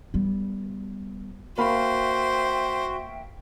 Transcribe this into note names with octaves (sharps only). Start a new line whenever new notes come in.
G3 B3
A#3 F#4 C5 E5 F5 G5 B5